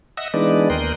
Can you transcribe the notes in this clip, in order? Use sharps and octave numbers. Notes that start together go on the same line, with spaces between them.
D#5 E5 F#5 E6 A#6
E3 G#3 B3 D4 D#4 D5
D#2 A#4 G5 C6 D#6 F#6